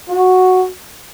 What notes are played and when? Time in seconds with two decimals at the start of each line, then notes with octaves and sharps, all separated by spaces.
0.09 F#4